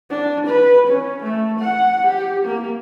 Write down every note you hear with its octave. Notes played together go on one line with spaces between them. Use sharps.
D4
B4
C#4
A3
F#5
G4
A#3